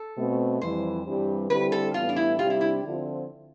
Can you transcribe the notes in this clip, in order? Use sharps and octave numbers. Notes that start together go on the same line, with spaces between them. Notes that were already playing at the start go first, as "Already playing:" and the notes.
Already playing: A4
B2 A3 C4
F2 E3 G3 C5
G2 E3 G3 C4 G4
D3 G3 C4 E4 G4 B4
A4
A2 E3 G3 B3 F4
D4
E4
C3 G3 D4 F4 G4
E4
E4
D3 F3 C4 F4